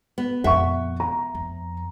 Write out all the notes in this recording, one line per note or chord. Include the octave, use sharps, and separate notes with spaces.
B3
F2 A#2 E5 F#5 C#6
A#5
F2